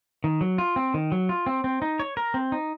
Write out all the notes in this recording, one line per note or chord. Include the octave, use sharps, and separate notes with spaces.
D#3
F#3
F4
C4
D#3
F#3
F4
C4
C4
D#4
C#5
A#4
C4
D#4